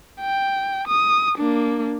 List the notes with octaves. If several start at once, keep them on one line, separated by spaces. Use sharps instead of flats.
G5
D#6
A#3 D4